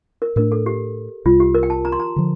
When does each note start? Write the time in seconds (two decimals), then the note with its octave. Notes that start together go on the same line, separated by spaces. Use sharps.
0.22 A#4
0.36 A2 A3 D4 A#4
0.52 A4
0.66 G4
1.25 C2 C3 G3 F4
1.40 G4
1.54 A#4
1.63 G5
1.70 A5
1.85 A#5
1.92 C6
2.00 A#5
2.16 D3 F3